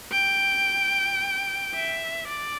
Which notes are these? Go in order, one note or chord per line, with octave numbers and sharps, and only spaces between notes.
G5
E5
D5